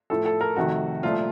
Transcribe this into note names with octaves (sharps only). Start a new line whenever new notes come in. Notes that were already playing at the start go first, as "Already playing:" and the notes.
A2 F3 A3 A4
A4
A#4
F2 C3 D#3 A3 F#4
C2 A#2 F3 A3 F4